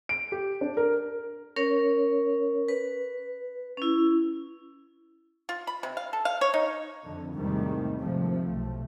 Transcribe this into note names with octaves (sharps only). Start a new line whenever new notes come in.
D7
G4
D4
A#4
C#4 A#4 C#5
B4
C#4 E4
F4
B5
C3
F5
A4
F5
C#5
D#4
F2 D3
E2 G#2 C3 D#3 G3 A3
G#1 C3 F3 A3
B1 A3